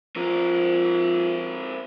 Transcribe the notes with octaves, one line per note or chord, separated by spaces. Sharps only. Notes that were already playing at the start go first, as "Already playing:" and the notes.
F3 C4 A#4